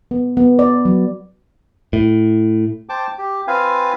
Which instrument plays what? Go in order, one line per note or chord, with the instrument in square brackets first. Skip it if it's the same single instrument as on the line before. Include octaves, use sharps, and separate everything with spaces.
[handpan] B3
B3
D5
F#3
[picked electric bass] A2
[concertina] C5 G5 A5 D6
G4
C4 F4 B4 F5 G#5